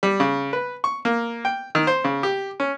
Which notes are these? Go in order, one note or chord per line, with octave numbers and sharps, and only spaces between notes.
G3
C#3
B4
C#6
A#3
G5
D#3
C5
C#3
G4
C#4